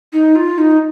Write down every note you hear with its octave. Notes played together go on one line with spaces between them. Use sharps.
D#4
F4
D#4